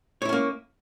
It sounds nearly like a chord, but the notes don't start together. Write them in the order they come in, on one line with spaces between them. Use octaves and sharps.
C#5 E4 C#4 A#3